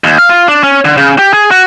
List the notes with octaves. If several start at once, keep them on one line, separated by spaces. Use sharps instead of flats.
D#2
F5
F4
D4
C#4
D3
C#3
G4
G#4
F#4